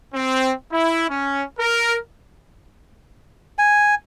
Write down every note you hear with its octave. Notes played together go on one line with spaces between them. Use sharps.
C4
E4
C#4
A#4
G#5